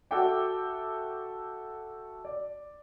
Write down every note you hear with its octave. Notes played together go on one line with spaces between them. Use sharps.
F#4 A4 E5 F#5 G5 D6
D5